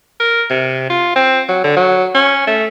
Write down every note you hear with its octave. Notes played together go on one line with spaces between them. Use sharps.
A#4
C3
F4
C4
F#3
D3
F#3
C#4
A3